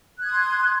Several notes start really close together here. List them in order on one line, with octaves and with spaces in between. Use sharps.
F#6 G#6 D#6 C6